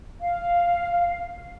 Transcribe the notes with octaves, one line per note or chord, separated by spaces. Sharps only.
F5